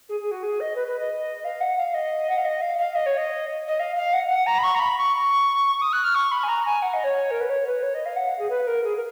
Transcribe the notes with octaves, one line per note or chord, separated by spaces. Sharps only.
G#4
G#4
F#4
G#4
D#5
B4
B4
D#5
F5
F#5
F5
D#5
F#5
F5
D#5
F5
F5
D#5
C#5
D#5
D#5
F5
F5
F#5
F#5
A#5
B5
C#6
A#5
B5
C#6
D#6
F#6
F6
C#6
B5
G#5
A#5
G#5
F#5
D#5
C#5
A#4
B4
C#5
B4
C#5
D#5
F5
F#5
F5
G#4
B4
A#4
G#4
A#4